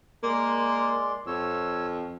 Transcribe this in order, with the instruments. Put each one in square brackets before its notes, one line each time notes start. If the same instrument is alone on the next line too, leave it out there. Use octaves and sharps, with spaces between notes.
[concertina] G#3 D5 C6 [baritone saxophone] A#3
[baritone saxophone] F2 [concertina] C#5 E6